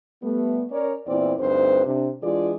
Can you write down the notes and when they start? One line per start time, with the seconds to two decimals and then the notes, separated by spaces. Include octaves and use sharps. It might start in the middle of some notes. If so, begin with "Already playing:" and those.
0.23 G3 A3 B3
0.71 C#4 A#4 C#5 D5
1.06 E2 A#2 C4 E4 D5
1.39 D2 G2 C4 D#4 B4 C5
1.86 C3 D4
2.23 E3 G#3 D4 F4 G#4 D5